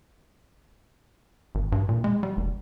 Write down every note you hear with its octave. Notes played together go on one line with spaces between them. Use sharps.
G#1
G2
A#2
G#3
G3
F1